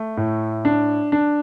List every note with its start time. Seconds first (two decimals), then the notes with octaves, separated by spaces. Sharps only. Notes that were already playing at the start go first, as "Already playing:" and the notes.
Already playing: A3
0.17 A2
0.65 D4
1.12 D4